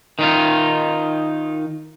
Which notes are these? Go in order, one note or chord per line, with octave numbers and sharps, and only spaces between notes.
D#3 D#4 F4